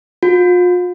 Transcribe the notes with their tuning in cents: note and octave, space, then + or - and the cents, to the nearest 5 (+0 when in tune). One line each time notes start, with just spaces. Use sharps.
F4 +40